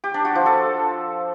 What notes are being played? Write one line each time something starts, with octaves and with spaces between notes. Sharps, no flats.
G4
D4
F#4
F3
A4